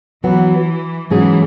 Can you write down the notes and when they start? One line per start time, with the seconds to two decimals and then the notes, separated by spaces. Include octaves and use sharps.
0.23 E3 F#3 B3 F#4
1.11 G#2 E3 F#3 C#4 G#4